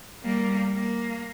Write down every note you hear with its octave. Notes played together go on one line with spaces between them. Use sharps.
G3 A#3
A#3